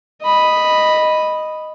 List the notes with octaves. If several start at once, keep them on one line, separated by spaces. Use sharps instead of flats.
D#5 B5